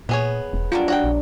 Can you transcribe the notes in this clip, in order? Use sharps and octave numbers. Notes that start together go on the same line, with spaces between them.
A#2 B3 G#4 C#5
E1
F#3 G3 D4 F4
F#4 F#5 G5
A#1